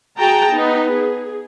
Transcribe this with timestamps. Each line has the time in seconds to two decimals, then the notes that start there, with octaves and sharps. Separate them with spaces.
0.18 F#4 G#4 G5 A5 A#5
0.51 B3 D#4
0.91 G#4